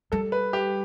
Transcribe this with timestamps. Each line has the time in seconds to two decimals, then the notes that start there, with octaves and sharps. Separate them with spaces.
0.12 G3 A4
0.32 B4
0.53 G4